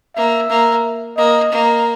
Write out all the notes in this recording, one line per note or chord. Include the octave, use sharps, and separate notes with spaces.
A#3 E5
A#3
A#3 D#5
A#3